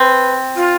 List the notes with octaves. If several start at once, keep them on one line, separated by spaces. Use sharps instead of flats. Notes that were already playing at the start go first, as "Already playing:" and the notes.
Already playing: C4 B4
F4